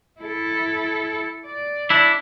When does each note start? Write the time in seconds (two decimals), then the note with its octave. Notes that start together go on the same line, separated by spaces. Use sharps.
0.21 E4 A4
1.45 D5
1.90 D4 E4